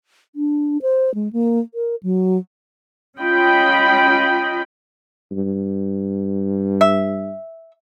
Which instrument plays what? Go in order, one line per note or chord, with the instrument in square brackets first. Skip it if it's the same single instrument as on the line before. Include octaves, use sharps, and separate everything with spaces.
[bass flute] D4
C5
G#3
A#3
A#4
F#3
[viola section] C#4 F4 D#5 G5 B5
[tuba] G2
[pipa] E5